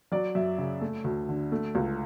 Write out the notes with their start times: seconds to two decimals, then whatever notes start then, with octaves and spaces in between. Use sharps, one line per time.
0.12 F#3 D5
0.35 F#2 E5
0.58 C#3
0.81 A3
1.04 D2
1.29 D3
1.52 A3
1.75 C#2